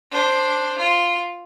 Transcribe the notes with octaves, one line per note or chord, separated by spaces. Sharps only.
D4 C5
F4